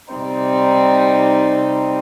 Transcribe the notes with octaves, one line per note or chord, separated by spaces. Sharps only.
C3 G3 C4 D#4